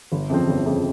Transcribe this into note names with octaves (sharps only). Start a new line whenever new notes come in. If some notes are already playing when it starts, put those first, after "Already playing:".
G1
F2 C#3 F3 C4
G1
F2 C#3 F3 C4